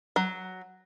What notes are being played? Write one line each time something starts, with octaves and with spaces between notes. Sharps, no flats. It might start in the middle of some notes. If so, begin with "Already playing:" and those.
F#3